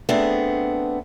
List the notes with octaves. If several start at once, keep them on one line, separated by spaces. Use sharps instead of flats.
A3 B3 C4 D4 G#4